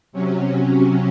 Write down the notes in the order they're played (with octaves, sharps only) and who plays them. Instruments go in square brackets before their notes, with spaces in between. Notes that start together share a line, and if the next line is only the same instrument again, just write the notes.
[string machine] C3 F#3 C#4